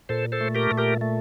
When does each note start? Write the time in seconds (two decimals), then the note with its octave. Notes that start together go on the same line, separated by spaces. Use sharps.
0.09 A#2 A4 C5
0.32 A4 C5
0.40 A3
0.55 G4 A#4
0.71 A#2
0.78 G4 A#4
1.01 A3